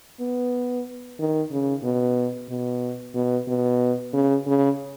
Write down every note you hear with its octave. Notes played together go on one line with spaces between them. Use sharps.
B3
D#3
C#3
B2
B2
B2
B2
C#3
C#3